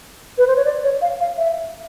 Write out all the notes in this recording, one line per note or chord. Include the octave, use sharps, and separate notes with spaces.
B4
C5
C#5
D5
C#5
F5
F5
E5